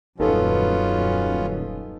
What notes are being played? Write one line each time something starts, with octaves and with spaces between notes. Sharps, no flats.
D#1 F#2 B3 C#4 D#4 F4 A4 B4